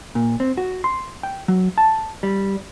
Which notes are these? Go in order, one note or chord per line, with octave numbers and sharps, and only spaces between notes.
A#2
C4
F#4
C6
G5
F#3
A5
G3